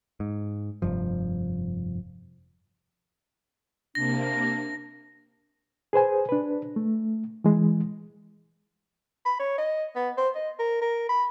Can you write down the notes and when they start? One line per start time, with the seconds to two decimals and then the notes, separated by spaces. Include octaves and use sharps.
0.20 G#2
0.82 F1 G2 F3
3.95 C3 A#3 D4 A#6
5.93 G#4 B4 C5 G#5
6.29 D4 B4
6.76 A3
7.44 E3 G#3
9.26 B5
9.40 C#5
9.58 D#5
9.96 B3
10.18 C5
10.35 D#5
10.59 A#4
10.82 A#4
11.09 B5